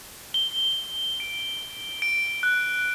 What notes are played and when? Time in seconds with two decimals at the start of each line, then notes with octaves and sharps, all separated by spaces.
0.34 G7
1.20 D7
2.02 D7
2.43 F#6